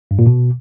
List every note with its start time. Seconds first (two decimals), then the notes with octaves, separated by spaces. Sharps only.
0.11 G2
0.19 A#2
0.27 B2